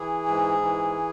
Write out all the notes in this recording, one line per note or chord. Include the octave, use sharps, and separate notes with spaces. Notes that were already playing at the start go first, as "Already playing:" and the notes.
Already playing: E3 G#4
G#2
E3